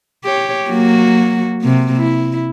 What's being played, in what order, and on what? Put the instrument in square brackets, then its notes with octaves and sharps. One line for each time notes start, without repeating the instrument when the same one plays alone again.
[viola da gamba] G4 C#5
F#3 A#3 F#4
C3 A#3
E4